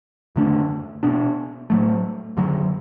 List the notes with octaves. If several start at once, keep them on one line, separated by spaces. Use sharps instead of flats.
F#2 D3 A3 D4
B2 B3 D4
A2 F#3 A3
F#2 D3 F#3